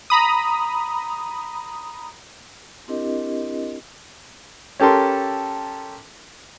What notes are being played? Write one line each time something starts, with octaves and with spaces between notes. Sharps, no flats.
A#5 B5 D#6
C4 D4 E4 G4 A#4 D#5
C#4 G4 A4 A#4 C6